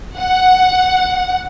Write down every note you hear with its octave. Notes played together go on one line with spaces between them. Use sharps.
F#5